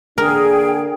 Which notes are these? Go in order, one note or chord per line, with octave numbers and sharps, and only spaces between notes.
D3 A#3 D4 G#4 A#4 G5